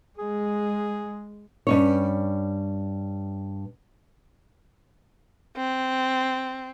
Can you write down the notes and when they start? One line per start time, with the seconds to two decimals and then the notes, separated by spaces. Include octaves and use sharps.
0.19 G#3 G#4
1.67 G2 C#4 C#5
5.57 C4